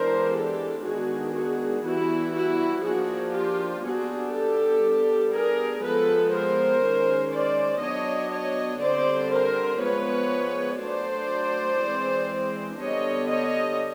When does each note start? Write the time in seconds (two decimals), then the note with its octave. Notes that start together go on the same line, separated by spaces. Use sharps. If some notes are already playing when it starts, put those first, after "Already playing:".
Already playing: E3 G#3 B3 D4 A#4 C5
0.35 G4 A4
0.85 D#3 G#3 B3 D4 F#4 G#4
1.34 F#4 G#4
1.84 E3 G3 B3 E4 F#4
2.34 E4 F#4
2.84 F3 A#3 D4 F#4 G#4
3.33 F4 G4
3.83 G3 B3 D4 F#4 G#4
4.33 G4 A4
4.83 G3 B3 D4
5.32 G#4 A#4
5.82 F3 G#3 B3 A4 B4
6.32 A#4 C5
6.82 D#3 G#3 C#4
7.32 C5 D5
7.81 F#3 B3 D4 C#5 D#5
8.32 C#5 D#5
8.81 D3 G3 C4 C5 D5
9.31 A#4 C5
9.80 F3 G#3 B3 B4 C#5
10.80 F#3 A3 D4 C5 D5
11.79 E3 G#3 C4
12.79 D3 G3 B3 D4 C#5 D#5
13.28 C#5 D#5